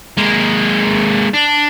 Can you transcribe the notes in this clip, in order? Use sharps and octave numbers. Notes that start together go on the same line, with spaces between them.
G#3 A#3
D4